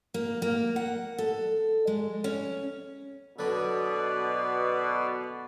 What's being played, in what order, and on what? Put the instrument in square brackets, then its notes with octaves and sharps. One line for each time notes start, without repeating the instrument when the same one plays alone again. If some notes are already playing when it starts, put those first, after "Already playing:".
[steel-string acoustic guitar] A#3
A#3
F#5
A4
G#3
C#4
[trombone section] B2 [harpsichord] D3 F#3 [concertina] B4 D5